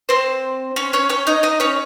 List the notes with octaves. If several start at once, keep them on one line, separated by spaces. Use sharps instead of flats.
C4 C5
C#4 C#5
C#4 C#5
C#4 C#5
D#4 D#5
D#4 D#5
C#4 C#5